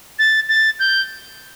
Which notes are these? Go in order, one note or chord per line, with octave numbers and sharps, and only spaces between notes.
A6
A6
G6